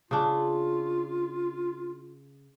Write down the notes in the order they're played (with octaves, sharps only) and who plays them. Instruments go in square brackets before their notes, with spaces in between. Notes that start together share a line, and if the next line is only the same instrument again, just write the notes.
[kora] C#3 D4 [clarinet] F4